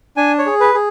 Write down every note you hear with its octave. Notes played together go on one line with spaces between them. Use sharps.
D4 G#5
C#5
G#4
B4
G#4